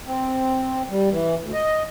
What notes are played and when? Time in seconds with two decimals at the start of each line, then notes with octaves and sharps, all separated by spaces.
0.06 C4
0.90 G3
1.11 E3
1.41 D2
1.53 D#5